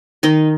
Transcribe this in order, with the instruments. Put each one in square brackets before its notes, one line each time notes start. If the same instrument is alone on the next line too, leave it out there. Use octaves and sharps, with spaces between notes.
[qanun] D#3 D#4